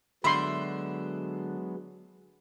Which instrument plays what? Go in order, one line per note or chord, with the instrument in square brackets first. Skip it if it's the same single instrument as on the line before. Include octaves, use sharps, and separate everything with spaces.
[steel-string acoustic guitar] D3 F#4 E5 [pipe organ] F#3 G#3 B3 [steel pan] B5 C6